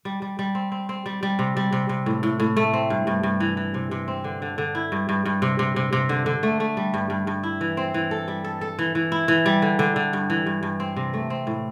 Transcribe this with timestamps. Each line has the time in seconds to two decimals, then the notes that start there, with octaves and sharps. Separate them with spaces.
0.05 G3
0.22 G3
0.39 G3
0.55 C4
0.72 C4
0.89 C4
1.06 G3
1.23 G3
1.39 C3
1.57 G3
1.72 C3
1.89 C3
2.06 A2
2.23 A2
2.40 A2
2.57 A3
2.73 C4
2.90 G2
3.07 G2
3.23 G2
3.40 E3
3.57 E3
3.74 C3
3.91 C3
4.08 C4
4.24 D3
4.42 D3
4.58 D3
4.75 E4
4.92 G2
5.09 G2
5.25 G2
5.42 C3
5.59 C3
5.76 C3
5.93 C3
6.09 D3
6.26 D3
6.43 A3
6.60 A3
6.77 G3
6.94 G2
7.10 G2
7.27 G2
7.43 E4
7.61 E3
7.77 C4
7.94 E3
8.11 A4
8.28 G3
8.45 A4
8.61 A4
8.79 E3
8.95 E3
9.12 E4
9.28 E3
9.46 G3
9.62 D3
9.79 D3
9.96 D3
10.13 G2
10.30 E3
10.46 G2
10.63 G2
10.80 C4
10.97 C3
11.14 A3
11.30 C4
11.47 A2